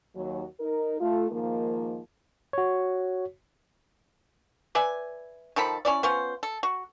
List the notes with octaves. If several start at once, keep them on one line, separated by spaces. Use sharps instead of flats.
D#2 F#3
D#4 A#4
A3 F4
G#2 D#3 F3 A#3
F#4 C#5
B4 D5 E5 G#5
D#3 F3 A4 B5
C#4 E4 D5
B3 C#4 F4 C5
A4
F#4